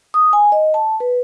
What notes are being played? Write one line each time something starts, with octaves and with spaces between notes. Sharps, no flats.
D#6
G#5
D#5
A5
B4